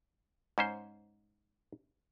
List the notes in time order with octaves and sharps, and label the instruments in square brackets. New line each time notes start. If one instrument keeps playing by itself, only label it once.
[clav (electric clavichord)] G#2 C#4 C5